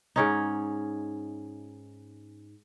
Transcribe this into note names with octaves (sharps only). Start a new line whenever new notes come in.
G#2 C#4 D#4